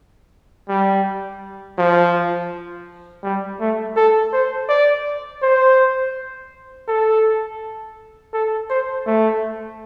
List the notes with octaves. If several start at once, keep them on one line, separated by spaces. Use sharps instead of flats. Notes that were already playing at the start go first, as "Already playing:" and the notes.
G3
F3
G3
A3
A4
C5
D5
C5
A4
A4
C5
A3